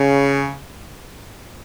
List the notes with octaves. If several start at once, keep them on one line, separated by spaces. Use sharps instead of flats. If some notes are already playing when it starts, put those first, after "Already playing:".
Already playing: C#3